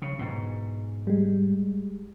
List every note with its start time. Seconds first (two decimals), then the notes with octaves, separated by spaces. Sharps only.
0.02 C#3
0.19 G#2 B2
1.07 G3 G#3